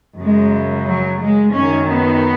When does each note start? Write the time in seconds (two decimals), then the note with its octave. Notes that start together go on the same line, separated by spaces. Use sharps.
0.18 F#2 C#3 G#3
0.86 F#3
1.20 G#3
1.53 F#2 D#3 C#4
1.87 B3